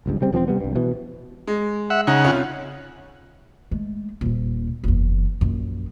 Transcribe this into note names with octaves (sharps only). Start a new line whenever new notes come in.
F#1 C#2 G2
C#3 G3 C4
E1 F3 A#3 C4
C3 G3 B3
C2 G2
B2 E3
G#3
E5 F#5
C#3 D#4 F#5
C2 C#4 F4
G#3 A3
D#1 A#2
F#1 E2
A#1 F#2